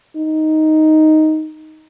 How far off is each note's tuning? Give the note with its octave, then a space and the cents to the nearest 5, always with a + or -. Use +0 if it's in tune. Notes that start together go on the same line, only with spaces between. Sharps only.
D#4 +5